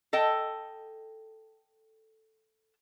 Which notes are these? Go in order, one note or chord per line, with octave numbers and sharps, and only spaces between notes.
A4 D#5 G5